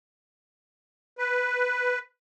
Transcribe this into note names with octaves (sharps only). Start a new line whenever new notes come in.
B4